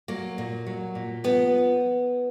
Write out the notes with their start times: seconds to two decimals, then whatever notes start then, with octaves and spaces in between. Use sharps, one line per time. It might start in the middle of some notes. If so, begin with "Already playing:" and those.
0.08 F#3 A#3
0.38 A#2
0.67 F#3
0.95 A#2
1.24 F3 B3